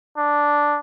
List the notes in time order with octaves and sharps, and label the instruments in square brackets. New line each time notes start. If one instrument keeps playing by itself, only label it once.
[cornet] D4